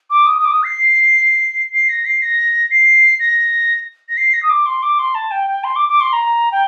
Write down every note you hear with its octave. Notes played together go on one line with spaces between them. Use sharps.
D6
D#6
D#6
D6
D#6
C7
C7
A#6
C7
A#6
C7
A#6
A#6
C7
A#6
D#6
D6
C6
D6
C6
A5
G5
G5
C6
D6
D6
C6
A#5
G5